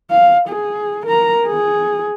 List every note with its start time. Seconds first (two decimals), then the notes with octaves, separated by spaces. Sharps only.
0.10 F5
0.48 G#4
1.06 A#4 A#5
1.46 G#4